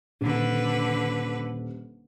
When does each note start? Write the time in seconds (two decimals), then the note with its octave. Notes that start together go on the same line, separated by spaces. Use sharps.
0.21 D#1 D3 B4